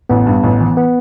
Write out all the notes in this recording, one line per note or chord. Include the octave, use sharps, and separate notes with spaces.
A1 B3
G2
A1
E3
B3